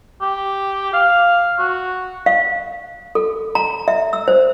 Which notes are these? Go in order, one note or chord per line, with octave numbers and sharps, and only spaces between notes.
G4
F5
F#4
F5
A4
A#5
E5
E6
C5